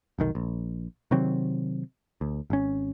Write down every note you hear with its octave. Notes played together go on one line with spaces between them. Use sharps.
F1 B1 D#3
A#1
C3 D#3 F#3 C4
D2
G#1 C#4